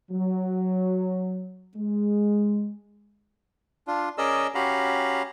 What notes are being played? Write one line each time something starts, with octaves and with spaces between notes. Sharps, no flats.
F#3
G#3
D4 F4
C#4 G#4 A#4 D5 D#5 E6
C#4 F#4 G4 F5 A#5 B5